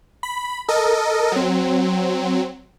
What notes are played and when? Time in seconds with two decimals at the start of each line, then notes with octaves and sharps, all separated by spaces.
0.23 B5
0.68 A4 A#4 D#5
1.32 F#3 C4